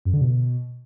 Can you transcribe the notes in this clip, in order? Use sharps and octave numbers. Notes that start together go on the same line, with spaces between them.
F#2
D3
B2